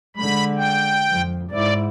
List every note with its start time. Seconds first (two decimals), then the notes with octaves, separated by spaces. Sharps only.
0.16 D3 G#3 B5
0.57 G5
1.08 F2
1.51 G#2 E4 D5